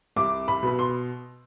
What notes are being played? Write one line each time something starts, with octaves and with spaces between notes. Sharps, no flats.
C2 D6
B5
B2 B5
C6